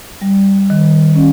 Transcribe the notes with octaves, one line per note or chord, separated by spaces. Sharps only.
G3
D#3
C#4